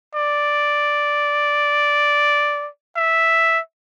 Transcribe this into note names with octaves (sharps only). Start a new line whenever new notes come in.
D5
E5